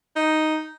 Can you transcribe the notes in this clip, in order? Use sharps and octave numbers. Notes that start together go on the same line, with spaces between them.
D#4